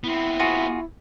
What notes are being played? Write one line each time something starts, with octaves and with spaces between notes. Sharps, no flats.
B3 C4 E4
F4 F#4 G#4